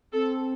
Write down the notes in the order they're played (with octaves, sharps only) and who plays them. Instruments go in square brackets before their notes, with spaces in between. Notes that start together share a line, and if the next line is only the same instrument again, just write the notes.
[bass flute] C4 [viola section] A4